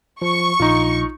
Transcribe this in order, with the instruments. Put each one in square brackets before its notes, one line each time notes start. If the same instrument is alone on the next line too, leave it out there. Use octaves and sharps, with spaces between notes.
[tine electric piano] F3 [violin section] C#6
[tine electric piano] A#1 [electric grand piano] D#4 F4